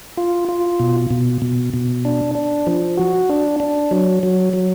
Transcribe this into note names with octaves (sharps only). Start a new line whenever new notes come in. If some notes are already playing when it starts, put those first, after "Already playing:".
F4
F4
B2
B2
B2
B2
D4
D4
F3
F#4
D4
D4
F#3
F#3
F#3